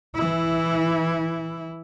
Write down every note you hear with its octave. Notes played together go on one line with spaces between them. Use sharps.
E3 E4